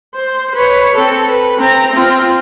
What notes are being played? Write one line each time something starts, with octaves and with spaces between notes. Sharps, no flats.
C5
B4 C#5
C4 A4
B4
C4 A#5
C4 F4